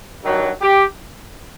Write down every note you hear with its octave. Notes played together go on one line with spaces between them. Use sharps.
G2 D#3 F#3
G4